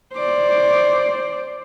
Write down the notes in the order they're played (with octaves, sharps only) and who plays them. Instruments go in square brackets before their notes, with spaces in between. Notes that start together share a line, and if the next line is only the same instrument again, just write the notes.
[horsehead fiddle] C5 D5